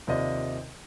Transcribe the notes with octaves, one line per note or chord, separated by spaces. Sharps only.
D#2 C3 F4 D5 D#5